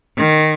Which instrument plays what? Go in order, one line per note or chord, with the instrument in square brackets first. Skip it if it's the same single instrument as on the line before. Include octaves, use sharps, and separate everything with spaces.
[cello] D#3